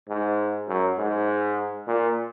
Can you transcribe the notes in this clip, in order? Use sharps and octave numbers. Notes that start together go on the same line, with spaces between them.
G#2
F#2
G#2
A#2